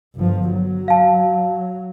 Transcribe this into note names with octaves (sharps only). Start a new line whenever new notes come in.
G1 F3
F#3
F5 A5